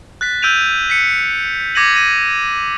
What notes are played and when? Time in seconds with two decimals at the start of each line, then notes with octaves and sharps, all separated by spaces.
0.21 F#6 A6 B6
0.42 E6 G6 D7 D#7 F7
0.90 B6 C#7
1.75 D6 G#6 A#6 C#7 D#7 F#7
1.94 A#6 D#7